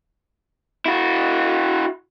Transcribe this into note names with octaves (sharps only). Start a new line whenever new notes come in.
E4 F#4